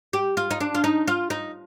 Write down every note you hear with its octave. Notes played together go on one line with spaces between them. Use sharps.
G4
F4
D#4
D4
F4
D#4
F4
D#4